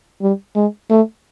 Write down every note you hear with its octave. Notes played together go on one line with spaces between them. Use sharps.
G3
G#3
A3